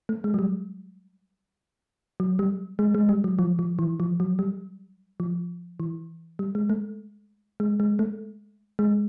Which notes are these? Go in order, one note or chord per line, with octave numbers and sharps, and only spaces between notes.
A3
G#3
F#3
G3
F#3
G3
G#3
G#3
G3
F#3
F3
F3
E3
F3
F#3
G3
F3
E3
G3
G#3
A3
G#3
G#3
A3
G#3